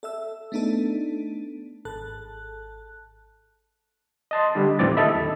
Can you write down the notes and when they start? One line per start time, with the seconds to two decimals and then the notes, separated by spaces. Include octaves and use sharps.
0.03 A4 E5 E6
0.52 A3 B3 D4 D#4 A4
1.85 G#1 A4 A5 F#6
4.31 D#5 A5 C6
4.55 D3 G3 D4 B5
4.79 D#2 A2 E3 C4 D6 A6
4.97 D3 A4 D#5 E5 B5
5.14 D#2